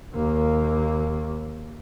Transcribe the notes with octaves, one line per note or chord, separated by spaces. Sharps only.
D#2 A#3